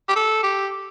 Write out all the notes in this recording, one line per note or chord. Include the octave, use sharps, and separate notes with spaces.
G4
A4
G4